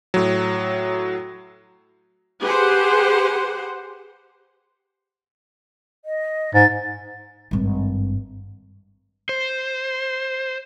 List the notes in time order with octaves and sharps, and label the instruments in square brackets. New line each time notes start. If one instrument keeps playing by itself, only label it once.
[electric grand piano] A2 F#3
[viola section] G4 G#4 B4 C5 F#5
[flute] D#5
[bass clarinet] G#2 [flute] A6
[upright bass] G#1 G2
[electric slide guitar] C5